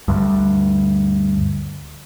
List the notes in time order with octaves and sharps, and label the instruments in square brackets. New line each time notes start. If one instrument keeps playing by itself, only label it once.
[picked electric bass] D2 G2